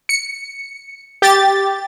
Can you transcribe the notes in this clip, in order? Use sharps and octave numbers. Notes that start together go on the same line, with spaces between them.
C#7
G4 A6